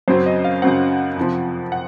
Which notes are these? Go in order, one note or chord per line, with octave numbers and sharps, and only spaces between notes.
F#2 C#3 F#3 C4 C5
D#5
F5
F#2 C#3 F#3 C4 F#5
F2 C3 F3
F#5